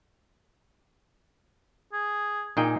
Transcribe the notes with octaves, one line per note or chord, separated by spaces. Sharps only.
G#4
A#2 D#4 G#4 G5